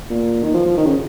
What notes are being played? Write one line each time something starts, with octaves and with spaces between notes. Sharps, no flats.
A#2
D#3
F3
F3
D#3
C#3